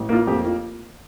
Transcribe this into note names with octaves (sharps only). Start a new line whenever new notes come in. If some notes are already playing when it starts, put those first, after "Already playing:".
Already playing: A1
A#3 F4
F2 G4
F4